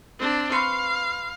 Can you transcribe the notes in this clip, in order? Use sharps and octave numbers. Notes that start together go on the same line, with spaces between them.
C4 D4
B4 F5 C6 C#6